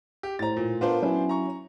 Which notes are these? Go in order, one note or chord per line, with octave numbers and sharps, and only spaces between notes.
G4
A2 C5 A#5 A6
A#2
B3 D4 F4 A#4 C5
F#3 C#4 E4
A#5 C#6